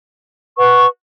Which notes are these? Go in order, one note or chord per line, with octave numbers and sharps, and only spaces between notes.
B4 F#5 C#6